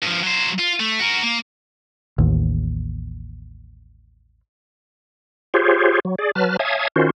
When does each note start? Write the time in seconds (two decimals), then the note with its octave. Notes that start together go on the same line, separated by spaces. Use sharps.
0.02 G2 F3
0.23 F#3 C5
0.59 F4
0.80 A3
1.00 F#4 A#4
1.22 A#3
2.18 A1 D#2
5.54 F4 G4 G#4 C5 C#5
6.05 F#3
6.19 G#4 D5
6.35 F#3 B4 A5 F6
6.59 C#5 E5 F5 G#5 A5 D#6
6.96 D#3 C#4 F4 F#4 C5